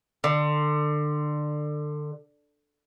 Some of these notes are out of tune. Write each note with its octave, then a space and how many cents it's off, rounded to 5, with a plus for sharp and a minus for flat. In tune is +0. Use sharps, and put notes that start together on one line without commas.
D3 +25